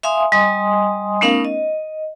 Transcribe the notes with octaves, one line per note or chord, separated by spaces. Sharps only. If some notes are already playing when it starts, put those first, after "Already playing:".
E5 F5 G#5 C6 D#6
G3 D#5 G#5 C6 D#6
A3 B3 C#4 D#4 A#4 F5
D#5